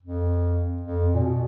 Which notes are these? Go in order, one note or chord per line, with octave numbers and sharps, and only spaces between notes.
F2
F2
A#2
B2